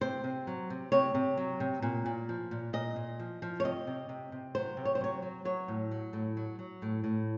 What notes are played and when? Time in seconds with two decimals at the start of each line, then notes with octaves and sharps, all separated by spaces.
0.01 C3 C5
0.24 C3
0.47 F#3
0.70 C3
0.92 C3 C#5
1.15 C3
1.37 F#3
1.60 C3
1.82 A#2
2.06 A#2
2.29 F3
2.51 A#2
2.73 A#2 D#5
2.96 A#2
3.19 F3
3.42 F3
3.60 C#5
3.64 C3 D#5
3.87 C3
4.09 C3
4.32 C3
4.55 F#3 C5
4.77 C3
4.85 C#5
4.95 C5
5.01 F#3 C#5
5.22 F#3
5.45 F#3 C#5
5.68 A2
5.91 F#3
6.13 A2
6.37 F#3
6.59 F#3
6.82 A2
7.04 A2